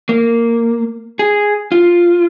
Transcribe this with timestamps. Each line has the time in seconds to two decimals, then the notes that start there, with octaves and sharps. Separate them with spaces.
0.09 A#3
1.19 G#4
1.72 F4